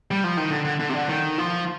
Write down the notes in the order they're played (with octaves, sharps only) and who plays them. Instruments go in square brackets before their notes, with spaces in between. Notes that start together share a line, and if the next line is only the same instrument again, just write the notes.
[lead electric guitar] G3
F3
D#3
D3
D3
D3
C3
D3
D#3
F3